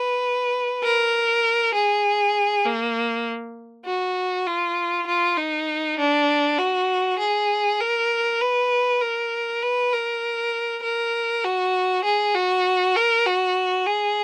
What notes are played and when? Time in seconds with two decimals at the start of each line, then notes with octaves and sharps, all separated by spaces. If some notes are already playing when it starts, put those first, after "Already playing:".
Already playing: B4
0.83 A#4
1.74 G#4
2.65 A#3
3.86 F#4
4.47 F4
5.07 F4
5.38 D#4
5.99 D4
6.58 F#4
7.19 G#4
7.80 A#4
8.41 B4
9.01 A#4
9.63 B4
9.93 A#4
10.83 A#4
11.44 F#4
12.04 G#4
12.35 F#4
12.96 A#4
13.26 F#4
13.86 G#4